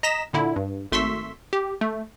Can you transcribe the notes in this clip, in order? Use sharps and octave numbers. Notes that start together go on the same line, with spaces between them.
D#5 A#5 A#6 B6 E7
A#2 D3 E4
G2
G#1 A3 C6 C#6 E6 B6
G4
A3